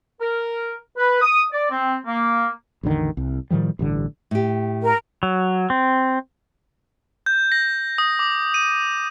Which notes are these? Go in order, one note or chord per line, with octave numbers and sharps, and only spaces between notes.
A#4
B4
D#6
D5
C4
A#3
A1 E2 D3 D#3
C2
A2 D#3 F3 G3
A1 G2 D3
A2 G4
A#4
F#3
C4
G6
A#6
D#6
D6
D#7